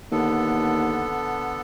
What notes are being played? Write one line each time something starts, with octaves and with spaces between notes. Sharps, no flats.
D#2 D3 B3 A4